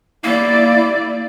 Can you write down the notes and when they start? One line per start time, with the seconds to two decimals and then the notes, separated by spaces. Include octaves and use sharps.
0.24 A#3 E4 D5